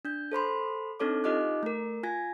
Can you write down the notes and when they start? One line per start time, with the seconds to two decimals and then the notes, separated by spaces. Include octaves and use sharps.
0.05 D4 G6
0.32 A4 C5 B5 C6
1.00 C4 D4 D#4 A4 C#5 D6
1.24 D#4 F4 G4 D#5 D6 F#6
1.63 A3 A#4
2.03 F4 G#5 G#6 A#6